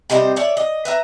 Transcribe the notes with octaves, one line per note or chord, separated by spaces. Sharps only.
C3 G3 D#4 C5
C#5 D5 E5
D#5
B4 E5 A#5